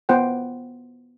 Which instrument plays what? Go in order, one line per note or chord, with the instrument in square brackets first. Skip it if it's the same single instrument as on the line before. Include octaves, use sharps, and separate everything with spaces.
[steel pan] B3 F4 C5 F#5 G5